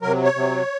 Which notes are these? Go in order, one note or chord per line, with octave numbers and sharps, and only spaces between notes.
C3 F#3 A#4
C#5
C3 F#3